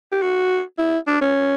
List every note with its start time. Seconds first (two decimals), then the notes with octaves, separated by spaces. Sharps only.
0.12 G4
0.22 F#4
0.79 E4
1.07 D4
1.21 C#4